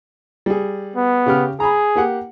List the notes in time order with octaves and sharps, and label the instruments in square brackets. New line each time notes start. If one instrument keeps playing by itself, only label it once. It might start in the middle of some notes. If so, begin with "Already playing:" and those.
[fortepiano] G3 G#4
[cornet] B3
[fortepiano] C#3 G4 F6
[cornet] G#4 [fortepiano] A#5 B5
[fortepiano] A#3 G4 F#5